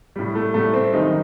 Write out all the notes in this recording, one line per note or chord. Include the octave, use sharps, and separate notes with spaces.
A2 G3
A3
A2 G3 A3
C4
F#2 D#3 G3 D#4